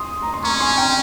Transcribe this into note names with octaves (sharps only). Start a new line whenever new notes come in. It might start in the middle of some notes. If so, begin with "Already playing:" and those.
Already playing: C6 D#6
A#5
C6
C#4 A#5 C#6
G#5 C6
G5 A#5